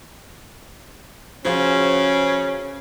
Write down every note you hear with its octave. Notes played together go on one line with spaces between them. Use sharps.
C#3 F3 C#4 F#4 G#4 C5